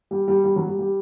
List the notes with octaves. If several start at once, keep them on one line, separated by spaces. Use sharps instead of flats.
G3
G3
G3
F#3
G3
G3